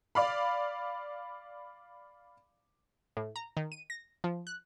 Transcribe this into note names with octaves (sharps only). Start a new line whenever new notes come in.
D5 F5 B5
A2
A#5
D#3
D#7
A#6
F3
F#6